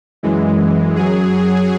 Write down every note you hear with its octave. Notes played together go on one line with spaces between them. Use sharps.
F#2 E3 G#3
F#2 F#3 G#4